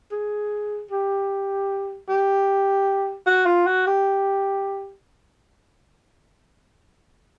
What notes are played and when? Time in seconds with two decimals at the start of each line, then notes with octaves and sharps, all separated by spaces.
0.12 G#4
0.91 G4
2.09 G4
3.27 F#4
3.46 F4
3.67 F#4
3.87 G4